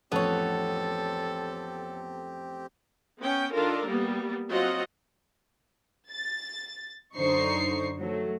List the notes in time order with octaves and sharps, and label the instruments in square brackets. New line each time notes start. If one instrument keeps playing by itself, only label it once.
[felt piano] A1 F2 [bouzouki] B3 C#5 [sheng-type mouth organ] C4 G4 [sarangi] A4
[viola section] B3 C#4 G5
D#3 D4 F4 A4 A#4
G3 A#3 B3
F#3 C4 F4 D#5 F#5
[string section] A6
F#2 D3 D#4 C5 C#6 C7
F#3 A3